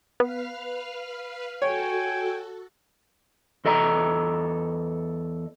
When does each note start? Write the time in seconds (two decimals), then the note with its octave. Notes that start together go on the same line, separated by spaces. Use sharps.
0.20 B3 B4 F5 F6
1.62 F#4 A4 C#5 G5 G#5
3.65 E2 A4 D#5 A#5